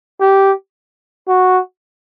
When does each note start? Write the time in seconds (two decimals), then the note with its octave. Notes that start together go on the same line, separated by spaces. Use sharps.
0.20 G4
1.28 F#4